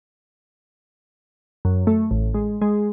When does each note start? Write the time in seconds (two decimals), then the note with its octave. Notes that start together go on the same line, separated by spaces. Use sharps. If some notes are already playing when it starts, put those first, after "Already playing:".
1.65 F#2
1.87 A3
2.11 A1
2.34 G#3
2.62 G#3